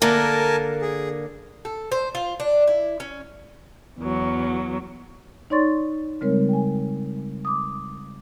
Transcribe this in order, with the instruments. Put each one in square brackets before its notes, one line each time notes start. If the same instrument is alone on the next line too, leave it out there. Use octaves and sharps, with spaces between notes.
[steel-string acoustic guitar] D3 A#3 [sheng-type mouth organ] A#4 G#5 A5
[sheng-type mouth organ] G#4
[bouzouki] A4
C5
F4
D4
E4
C#4
[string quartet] E2 F#3
[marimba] D#4 C#5 D5 C6 C#6 A6
C#3 G3 G#3 C4 A#4 C#5
G5 G#5
D6 D#6